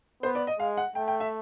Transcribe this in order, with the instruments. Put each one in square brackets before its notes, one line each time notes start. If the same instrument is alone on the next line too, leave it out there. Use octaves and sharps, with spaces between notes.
[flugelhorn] B3 [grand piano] C5
[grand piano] D5
D#5
[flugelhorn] G#3 [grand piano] F5
[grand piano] F#5
[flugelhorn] A3 [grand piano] G5
[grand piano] G5
E5